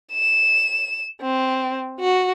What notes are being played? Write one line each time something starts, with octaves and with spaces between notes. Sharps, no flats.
E7
C4
F#4